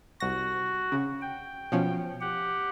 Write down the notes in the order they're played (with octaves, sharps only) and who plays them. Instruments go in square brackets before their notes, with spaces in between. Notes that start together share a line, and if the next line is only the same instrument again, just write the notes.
[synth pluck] C2 A#6 [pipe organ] F#4
[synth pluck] C#3
[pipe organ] G5
[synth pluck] B2 F3 C#4
[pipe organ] G4 F#5